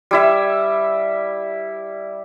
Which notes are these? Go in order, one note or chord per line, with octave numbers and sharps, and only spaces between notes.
G3 E4 E5